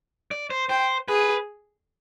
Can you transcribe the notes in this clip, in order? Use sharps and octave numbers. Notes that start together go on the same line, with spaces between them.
D5
C5
C5 G5
G#4 B4